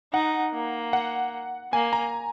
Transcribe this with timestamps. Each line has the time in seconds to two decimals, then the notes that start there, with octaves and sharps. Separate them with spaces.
0.13 D#4 F#5
0.53 A#3
0.93 F#5
1.73 A#3 G#5
1.93 A#5